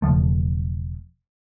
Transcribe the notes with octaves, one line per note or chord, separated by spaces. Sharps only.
E1 C#3 F3 A3